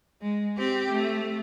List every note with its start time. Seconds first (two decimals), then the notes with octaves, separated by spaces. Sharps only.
0.22 G#3
0.58 C4 G4
0.92 A3